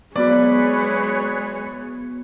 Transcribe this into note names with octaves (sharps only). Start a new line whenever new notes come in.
F#3 G#3 B3 F#4 B4 C#5 D5